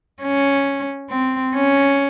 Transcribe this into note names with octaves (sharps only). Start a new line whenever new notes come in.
C#4
C4
C#4